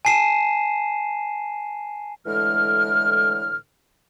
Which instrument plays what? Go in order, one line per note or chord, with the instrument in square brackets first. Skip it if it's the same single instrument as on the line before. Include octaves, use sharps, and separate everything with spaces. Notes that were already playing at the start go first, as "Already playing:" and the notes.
[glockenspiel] G#5 A5 C7 D#7 E7
[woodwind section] A2 D3 E3 G#3 F6